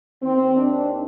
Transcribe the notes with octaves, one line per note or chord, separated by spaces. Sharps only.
D#2 D#3 C4
D4